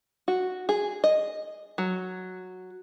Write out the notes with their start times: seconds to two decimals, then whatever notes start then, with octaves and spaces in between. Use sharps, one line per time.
0.28 F#4
0.69 G#4
1.04 D#5
1.78 F#3